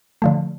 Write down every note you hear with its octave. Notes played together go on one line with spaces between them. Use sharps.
D3 F3 A3